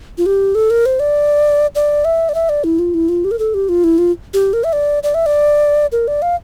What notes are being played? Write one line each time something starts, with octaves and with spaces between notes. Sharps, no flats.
F4
G4
A4
A#4
C5
D5
D5
E5
D5
E5
D5
E4
F4
E4
F4
G4
A#4
A4
G4
F4
E4
F4
G4
A#4
E5
D5
D5
E5
D5
A#4
D5
F5